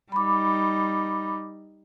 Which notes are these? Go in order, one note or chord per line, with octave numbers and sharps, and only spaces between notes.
G3 D#4 B5 D6